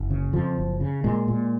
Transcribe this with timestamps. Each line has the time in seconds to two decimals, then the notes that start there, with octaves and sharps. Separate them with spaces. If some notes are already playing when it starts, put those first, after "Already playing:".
Already playing: F#1
0.10 C#3
0.33 F2 F3
0.58 F#1
0.81 C#3
1.04 A#2 G#3
1.28 A#2